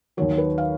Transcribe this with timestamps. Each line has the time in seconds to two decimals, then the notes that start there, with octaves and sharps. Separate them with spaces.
0.17 D#2 D#3 F#3 C#5
0.38 B4
0.58 F5